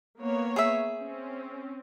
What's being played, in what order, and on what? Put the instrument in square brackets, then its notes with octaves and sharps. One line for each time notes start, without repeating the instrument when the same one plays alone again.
[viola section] A#3 B3 C#5
[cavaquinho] G#4 E5
[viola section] C4 C#4